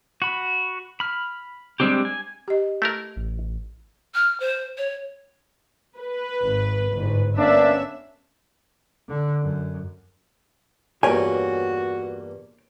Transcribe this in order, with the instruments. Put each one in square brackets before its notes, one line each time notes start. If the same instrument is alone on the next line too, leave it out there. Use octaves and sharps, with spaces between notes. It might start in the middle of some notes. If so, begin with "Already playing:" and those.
[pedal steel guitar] F#4 B5
B5 F6
G3 G#3 C4 D4 G4
G#5
[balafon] G4 D#5
[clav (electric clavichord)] A3 E4 A#4
[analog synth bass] A1
[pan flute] F6
C5
C#5
[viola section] B4
[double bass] G#1
G1 G#2
[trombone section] A#3 B3 D4 [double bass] C#4 [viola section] E5
[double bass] D3
F#2
[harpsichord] E2 G2 A#2 [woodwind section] F#4 [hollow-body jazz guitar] C#5 G5 G#5